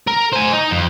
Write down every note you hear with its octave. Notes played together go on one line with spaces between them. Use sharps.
A#4
C5 G#5
D#4
F2